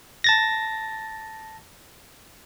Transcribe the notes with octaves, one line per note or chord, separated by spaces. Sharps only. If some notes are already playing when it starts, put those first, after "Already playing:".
A5 A6 A#6